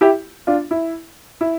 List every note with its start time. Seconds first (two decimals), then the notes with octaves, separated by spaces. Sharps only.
0.01 E4 G4
0.47 D4 F4
0.71 E4
1.41 E4